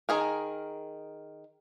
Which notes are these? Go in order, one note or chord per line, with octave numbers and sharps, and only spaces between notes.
D#3 G#4 A#4